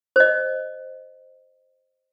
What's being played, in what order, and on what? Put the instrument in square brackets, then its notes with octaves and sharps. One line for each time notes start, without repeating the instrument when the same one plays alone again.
[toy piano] C5 D#5